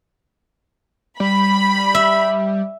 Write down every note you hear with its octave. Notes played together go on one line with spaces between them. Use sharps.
G3 B5
E5